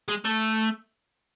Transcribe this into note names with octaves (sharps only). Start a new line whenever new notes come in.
G#3
A3